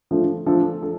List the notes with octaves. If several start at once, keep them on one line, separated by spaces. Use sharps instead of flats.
F3 A3 D4 A4
F3 A3 D4 A4
A4